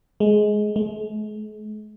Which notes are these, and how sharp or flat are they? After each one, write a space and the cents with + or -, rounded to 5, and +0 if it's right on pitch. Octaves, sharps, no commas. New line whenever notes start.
G#3 +15
G#3 +45